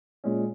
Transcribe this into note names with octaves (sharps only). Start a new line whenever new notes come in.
A#2 G#3 C#4